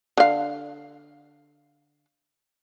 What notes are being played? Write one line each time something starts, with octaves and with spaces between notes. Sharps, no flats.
D3 F5